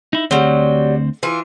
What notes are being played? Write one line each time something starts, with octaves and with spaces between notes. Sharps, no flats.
D#4 E4
D2 F#3 G3 C4 C5
E3 F4